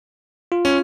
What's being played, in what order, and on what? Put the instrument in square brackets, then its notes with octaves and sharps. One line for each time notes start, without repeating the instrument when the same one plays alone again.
[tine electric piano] F4
[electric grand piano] C#4